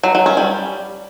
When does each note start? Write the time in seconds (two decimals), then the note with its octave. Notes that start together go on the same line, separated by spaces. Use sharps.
0.03 F#3
0.15 F#3
0.26 C#4
0.37 G3